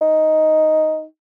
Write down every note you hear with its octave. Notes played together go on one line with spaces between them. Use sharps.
D#4